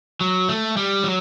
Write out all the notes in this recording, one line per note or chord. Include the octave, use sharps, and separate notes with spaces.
F#3
A3
G3
F#3